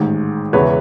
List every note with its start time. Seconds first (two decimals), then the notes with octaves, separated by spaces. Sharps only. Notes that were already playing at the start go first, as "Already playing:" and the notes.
Already playing: A1 G#2 D#3 G#3
0.53 E1 E2 C#3 E3 B4 C#5